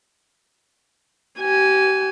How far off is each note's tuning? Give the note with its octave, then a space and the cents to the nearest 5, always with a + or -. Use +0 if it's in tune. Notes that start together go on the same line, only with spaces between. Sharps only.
G4 -35 G#5 +0